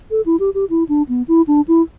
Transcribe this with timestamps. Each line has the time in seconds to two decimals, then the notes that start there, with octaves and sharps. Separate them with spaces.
0.11 A4
0.26 E4
0.40 G4
0.55 G4
0.70 E4
0.89 D4
1.09 B3
1.28 E4
1.47 D4
1.68 E4